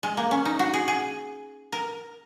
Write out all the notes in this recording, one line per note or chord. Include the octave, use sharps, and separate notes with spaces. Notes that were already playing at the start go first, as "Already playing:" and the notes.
G#3
A#3
C#4
D#4
F#4
G#4
G#4
A#4